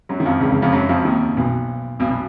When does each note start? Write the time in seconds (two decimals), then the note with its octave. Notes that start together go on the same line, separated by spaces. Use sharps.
0.09 F#2 F#3
0.20 D#3
0.26 F2 F3
0.41 C#2 C#3
0.52 C#2 C#3
0.62 F2 F3
0.72 F#2 F#3
0.89 F2 F3
1.05 D#2 D#3
1.37 B1 B2
2.00 B1 B2
2.10 B2